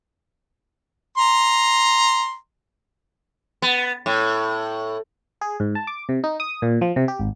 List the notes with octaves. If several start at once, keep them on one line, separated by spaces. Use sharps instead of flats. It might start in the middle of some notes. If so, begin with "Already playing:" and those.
A#5 C6
B3
A2
G#4
G#2
A5
D6
C3
D#4
D#6
A#2
F3
C3
G4
G#1